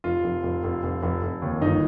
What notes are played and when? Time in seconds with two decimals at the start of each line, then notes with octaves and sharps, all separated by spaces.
0.04 F1 F4
0.24 F1
0.43 F1
0.64 F1
0.83 F1
1.03 F1
1.23 F1
1.42 D#2
1.62 G1 D#4